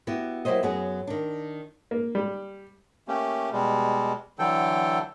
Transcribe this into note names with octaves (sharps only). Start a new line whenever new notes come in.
B3 E4 F#4 G4
F#3 A#3 E4 G4 C5 D#5
F#2 F#3 B3 G#4
D#3 D4
A#3
G3
A3 A#3 C#4 G4
B2 G3 G#3
D3 E3 F#3 A4 G5